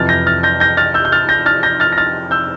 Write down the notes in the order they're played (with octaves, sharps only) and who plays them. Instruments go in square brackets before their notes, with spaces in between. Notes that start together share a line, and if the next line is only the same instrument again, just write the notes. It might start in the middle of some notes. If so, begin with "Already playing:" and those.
Already playing: [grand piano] F2 C3 E3 F6 A6
G6 A#6
F6 A6
G6 A#6
G6 A#6
F6 A6
E6 G6
G6
F6 A6
G6 A#6
F6 A6
G6 A#6
F6 A6
A#6
F6 A6
E6 G6